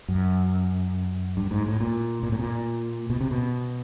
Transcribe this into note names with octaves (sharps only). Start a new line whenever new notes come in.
F#2
G2
G#2
A2
A#2
A#2
A2
A#2
B2
C3
B2